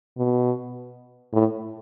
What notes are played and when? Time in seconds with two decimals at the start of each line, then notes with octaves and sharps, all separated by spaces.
0.18 B2
1.33 A2